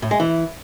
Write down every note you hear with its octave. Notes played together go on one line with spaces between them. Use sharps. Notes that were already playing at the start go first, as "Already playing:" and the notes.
A2
G#3
E3